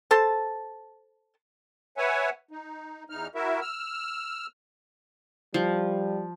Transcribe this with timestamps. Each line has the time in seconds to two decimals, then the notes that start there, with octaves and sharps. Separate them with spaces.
0.11 A4 C5 A5
1.97 B4 C#5 E5 F#5 G#5
2.51 D#4
3.10 E2 D#4 F6
3.35 E4 F#4 A#4 E5
3.61 E6 F6
5.54 F3 G3